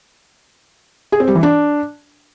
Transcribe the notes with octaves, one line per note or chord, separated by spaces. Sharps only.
G#4
C4
G3
E3
D4